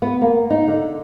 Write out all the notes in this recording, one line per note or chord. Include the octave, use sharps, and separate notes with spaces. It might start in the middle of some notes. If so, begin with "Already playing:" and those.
B3
A#3
D#4
D3